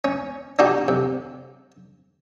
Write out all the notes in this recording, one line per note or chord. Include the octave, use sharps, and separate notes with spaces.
C#4
D4 D#4 F#4 G4
C3